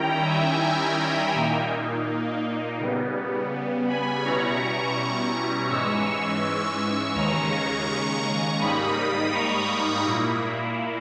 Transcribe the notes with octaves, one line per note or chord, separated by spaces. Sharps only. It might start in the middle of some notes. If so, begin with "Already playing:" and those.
Already playing: D#3 G3 C#4 E4 G5 A#5
E5 G#5
A#2 A#3 D#4
C#3 G3 B3
G#5 B5
B2 G3 C#4 E4 A#5 C#6
G#2 E3 G#3 C#4 C#6 E6
D#2 C#3 G#3 C#4 A#5 C#6
G#2 G3 A#3 D#4 B5 D#6
B5 D#6
A#5 C#6
A#2 A#3 E4